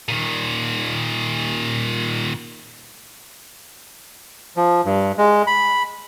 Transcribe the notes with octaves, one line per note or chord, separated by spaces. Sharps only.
A#2 D#3
F3
G2
G#3
B5